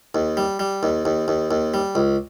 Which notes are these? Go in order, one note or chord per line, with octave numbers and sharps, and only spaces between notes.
D#2
G3
G3
D#2
D#2
D#2
D#2
G3
C#2